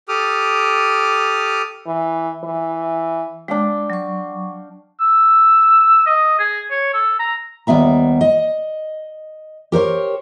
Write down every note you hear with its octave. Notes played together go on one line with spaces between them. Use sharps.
G4 A4 D6 D#6 F6
E3
E3
G#3 D4 F5 G5
F#3 C#6
E6
D#5
G#4
C#5
A4
A#5
D#2 G3 B3 E5 A#5
D#5
G4 A#4 C5 C#5